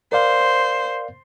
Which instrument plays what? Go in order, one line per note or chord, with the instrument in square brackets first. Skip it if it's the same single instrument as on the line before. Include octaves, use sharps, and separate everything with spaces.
[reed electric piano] A#4 D5 F5 [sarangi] C5